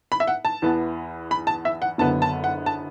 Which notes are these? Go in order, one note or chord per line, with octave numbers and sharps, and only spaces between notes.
B5
E5
F#5
A5
E2 E3 B3
B5
A5
E5
F#5
F#1 F#2 D3 B3 A5
A5
F#5
A5